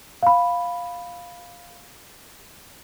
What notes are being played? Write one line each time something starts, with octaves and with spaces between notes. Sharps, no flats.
F5 B5